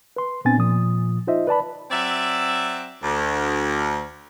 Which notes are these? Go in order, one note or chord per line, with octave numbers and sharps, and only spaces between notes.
B4 C6
A#2 B3 C4 D4 G#5 A6
A#2 F3 D#6
D#4 F4 C5 D#5 E5
B4 D5 A5 B5
F#3 C4 D5 E5
D2